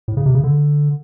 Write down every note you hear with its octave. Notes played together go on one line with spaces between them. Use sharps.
A2
C#3
C3
C#3
D3